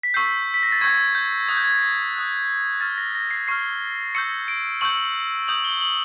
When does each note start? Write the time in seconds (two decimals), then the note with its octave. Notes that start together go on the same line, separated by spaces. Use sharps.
0.03 B6
0.14 C#6 E6 G6 C7
0.54 B6
0.63 A#6
0.72 A6
0.81 C#6 E6 G6 G#6
1.15 G6
1.49 D#6 F#6 G#6
1.57 G6
1.64 G#6
2.15 D#6 F#6
2.81 C#6 F6 A6
2.98 A#6
3.15 A#6
3.31 C7
3.48 C#6 F6 C7
4.15 C#6 E6 G6 C#7
4.48 D7
4.81 C#6 E6 G6 F#7
5.48 D#6 G6 F#7
5.64 G7
5.81 F#7